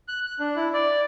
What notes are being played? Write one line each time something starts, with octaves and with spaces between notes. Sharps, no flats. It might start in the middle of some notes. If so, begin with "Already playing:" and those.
F#6
F#6
D4
E4
D5